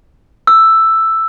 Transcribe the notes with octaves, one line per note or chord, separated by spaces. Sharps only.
E6